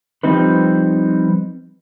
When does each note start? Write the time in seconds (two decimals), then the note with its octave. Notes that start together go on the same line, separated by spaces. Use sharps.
0.23 F3 G3 C4 D#4 B4